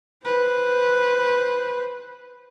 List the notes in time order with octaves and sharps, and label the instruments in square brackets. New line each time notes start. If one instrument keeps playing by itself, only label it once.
[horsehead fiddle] B4 C5